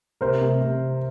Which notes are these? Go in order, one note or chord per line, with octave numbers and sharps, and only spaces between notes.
C3 A#4 C5
C3
C3